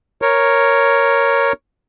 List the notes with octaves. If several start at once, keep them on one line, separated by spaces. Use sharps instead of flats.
A#4 C#5